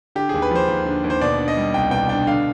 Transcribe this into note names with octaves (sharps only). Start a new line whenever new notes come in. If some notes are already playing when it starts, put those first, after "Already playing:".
D3 G4
G#4
D#2
B4
F3 C5
D#2
D3
D#2
C5
B2 D5
D4
D#5
G3
C2 G5
B2 G5
D4 G5
D3 F5